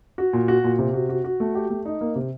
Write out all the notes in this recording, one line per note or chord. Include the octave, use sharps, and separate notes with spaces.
F#4
A#2
F#4
A#2
C3
F#4
F#4
F#4
A3
G4
A3
D#4
A#3
C3